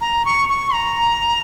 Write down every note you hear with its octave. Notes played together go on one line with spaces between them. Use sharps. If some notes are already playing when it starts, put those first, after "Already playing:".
A#5
C#6
C#6
A#5